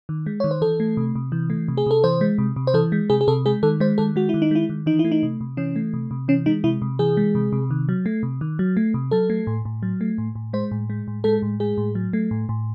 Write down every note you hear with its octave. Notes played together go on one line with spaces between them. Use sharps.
D#3
G#3
D#3 C#5
C5
E3 A4
A3
C3
C3
E3
A3
C3
G#4
C3 A4
E3 C5
G#3
C3
C3
C5
E3 A4
G#3
C3 G#4
G#4
C3 A4
G#3 G#4
D#3 A4
G#3 C5
D#3 A4
G#3 F#4
D#3 E4
D#4
G#3 E4
D#3
E3 D#4
E4
A3
D#4
C3
C3
E3 C#4
A3
C3
C3
E3 C#4
G#3 D#4
C3 E4
C3
E3 G#4
G#3
C3
C3
D#3
F#3
A3
C3
D#3
F#3
A3
C3
F#3 A4
A3
A2
A2
F#3
A3
A2
A2
G#3 C5
A2
G#3
A2
G#3 A4
A2
G#3 G#4
A2
F#3
A3
A2
A2